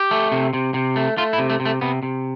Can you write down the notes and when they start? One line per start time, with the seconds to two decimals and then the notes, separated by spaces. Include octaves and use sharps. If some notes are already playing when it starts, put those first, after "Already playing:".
Already playing: G4
0.11 A3
0.32 C3
0.53 C3
0.74 C3
0.96 A3
1.17 A3 F4
1.33 E4
1.38 C3
1.50 A3
1.60 C3
1.66 A3
1.81 C3 B3
2.03 C3